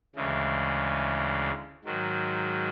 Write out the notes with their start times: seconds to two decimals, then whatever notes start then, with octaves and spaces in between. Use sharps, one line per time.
0.15 D2 C#3 E3 G#3
1.84 G#2 D#3 F#3